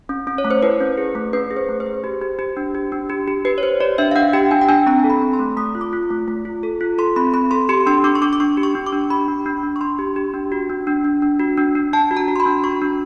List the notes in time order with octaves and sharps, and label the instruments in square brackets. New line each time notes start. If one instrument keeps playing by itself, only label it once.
[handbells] C#4
C#4
C#5
A3
C5
E4 B4
C#4
G#4
A3
C#4 B4
G#4
C5
A3
C5
G#4
G4
G4
G4
D4
G4
D4
G4
G4
G4 B4
C#5
G4 C5
G4 D5
D4 E5
F5
D4 F#5
G4 G5
D4 G#5
G5
D4 G#5
C4 A#5
A4
B5
C4
C6
A3
A3 D#6
F4
D6
F4
A3
A3
F4
A4
F4
A4 C6
C4 B5
C4 B5
A4 C6
G4 C6
D4 C6
D4 D6
C#6
D4 D6
D6
D4 C#6
G4
C#6
D4
D6
D4
G4 B5
D4
D4
D4
C#6
D4 C6
G4
G4
D4
F#4
D4
D4
D4
D4
F#4
D4
D4
D4 A5
F#4
A#5
F#4
C6
B5
D4
F#4 C#6
D4